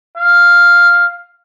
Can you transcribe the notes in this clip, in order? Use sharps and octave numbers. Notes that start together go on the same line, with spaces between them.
F5